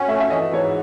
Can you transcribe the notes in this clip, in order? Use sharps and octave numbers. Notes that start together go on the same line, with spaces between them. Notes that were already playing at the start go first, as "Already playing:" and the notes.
Already playing: C#4 F#5
A3 E5
E5
E3 D#5
G#2 C#5